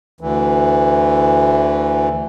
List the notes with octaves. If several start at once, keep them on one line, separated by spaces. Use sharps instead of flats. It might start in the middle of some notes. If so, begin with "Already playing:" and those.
D2 E3